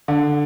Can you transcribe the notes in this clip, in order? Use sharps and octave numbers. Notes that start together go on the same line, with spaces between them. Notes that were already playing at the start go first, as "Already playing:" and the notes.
D3